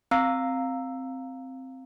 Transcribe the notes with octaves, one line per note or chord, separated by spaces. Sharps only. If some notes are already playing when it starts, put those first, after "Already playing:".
C4 F5 A#5 E6 C7